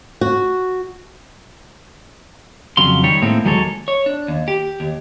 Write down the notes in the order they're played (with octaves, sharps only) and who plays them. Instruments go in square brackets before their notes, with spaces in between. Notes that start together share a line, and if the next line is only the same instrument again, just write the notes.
[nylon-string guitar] F#4
[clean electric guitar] F2 C#3 F#3 F5 C6
D#3 G3 C#5
A2 G#3 A#3 C4
D#2 F#3 G#3 A#3 A4 C#5
C#5
D4
D#2
G4
D#2